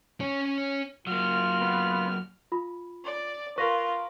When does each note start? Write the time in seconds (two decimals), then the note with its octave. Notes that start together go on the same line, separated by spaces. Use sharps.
0.20 C#4 C#5
1.07 F#3 A#3 F4 F6
1.62 B3
2.52 F4 B5
3.04 D5
3.58 F4 A#4 B4 C#6 A#6